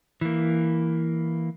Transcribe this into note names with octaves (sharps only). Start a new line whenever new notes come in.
E3 A#3